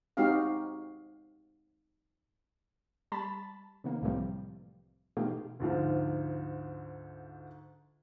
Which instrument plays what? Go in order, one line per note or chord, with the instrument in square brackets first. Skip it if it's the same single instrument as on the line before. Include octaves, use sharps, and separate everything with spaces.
[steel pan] G#3 C4 D#4 F#4 G4 F5
[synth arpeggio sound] G3 A5 B5
C3 D#3 A#3
C2 A2 C3 E3 F3 G3
B2 E3 A3 D#4 F4 G4
[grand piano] D2 G#2 F3